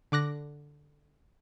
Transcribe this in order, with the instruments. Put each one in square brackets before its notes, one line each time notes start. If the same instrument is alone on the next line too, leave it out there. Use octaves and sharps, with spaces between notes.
[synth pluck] D3 D6 F#6 A#6